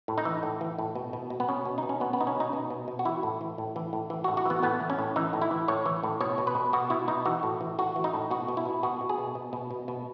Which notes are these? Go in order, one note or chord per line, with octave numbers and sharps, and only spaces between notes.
A2
D#4
E3
A2
E3
A2
B2
B2
B2
B3
B2 C#4
B2
D#4
B2
C#4
B2 B3
B3
B2 D#4
C#4
B2
D#4
B2
B2
B2
F#4
E3 E4
A2
E3
A2
E3
A2
E3
F#4
A2
F#4
E3 B3
A2 B3
E3
C#4
A2
E3 D#4
A2
E4
E3
A2 C#5
E3
A2
B2 C#5
B2
B4
B2
B2 F#4
B2 E4
B2 D#4
E3 F#4
A2
E3
A2 F#4
E3
D#4
A2
B2 F#4
B2
E4
B2
B2 F#4
B2
G#4
B2
B2
B2
B2
B2